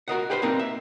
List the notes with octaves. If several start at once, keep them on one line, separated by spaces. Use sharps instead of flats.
F#4 A#4 D#5 F#5
G4 G#4 B4 C5
A#3 C4 D4 D#4 A#4
E5